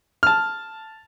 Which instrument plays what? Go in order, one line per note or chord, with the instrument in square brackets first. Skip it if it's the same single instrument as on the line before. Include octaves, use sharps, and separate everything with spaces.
[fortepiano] A5 F6